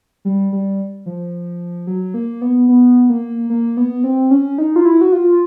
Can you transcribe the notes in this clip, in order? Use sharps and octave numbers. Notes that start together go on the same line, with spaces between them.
G3
G3
F3
F#3
A#3
B3
B3
A#3
A#3
B3
C4
C#4
D#4
F4
E4
F#4
F4